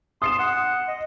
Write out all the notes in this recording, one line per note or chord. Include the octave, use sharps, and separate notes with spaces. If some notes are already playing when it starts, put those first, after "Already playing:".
C6 D#6 C7 E7
F#5
D#5